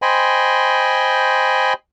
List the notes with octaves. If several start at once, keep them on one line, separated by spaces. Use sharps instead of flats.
C5 D#5 G5 G#5 B5 C6